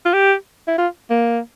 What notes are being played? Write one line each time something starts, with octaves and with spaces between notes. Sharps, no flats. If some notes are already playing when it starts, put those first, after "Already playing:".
F4
G4
E4
F4
A#3